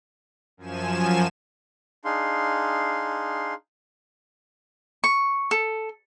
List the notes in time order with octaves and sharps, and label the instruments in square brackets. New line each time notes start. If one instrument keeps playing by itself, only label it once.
[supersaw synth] F#2 F3 G#5 E7
[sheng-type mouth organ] D4 D#4 G#4 F5 C6
[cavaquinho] C#6
A4